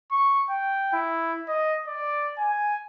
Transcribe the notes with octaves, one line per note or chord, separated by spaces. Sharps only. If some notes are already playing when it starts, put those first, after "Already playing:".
C#6
G5
E4
D#5
D5
G#5